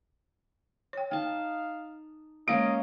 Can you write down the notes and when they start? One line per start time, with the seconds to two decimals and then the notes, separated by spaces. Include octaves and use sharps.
0.93 C#5 G5
1.11 D#4 F5 G5 A5
2.48 G#3 A#3 C#4 D#5 F5 D7